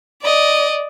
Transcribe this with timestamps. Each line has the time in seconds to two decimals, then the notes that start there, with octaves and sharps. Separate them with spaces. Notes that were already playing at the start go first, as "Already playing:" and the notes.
0.22 D5 D#5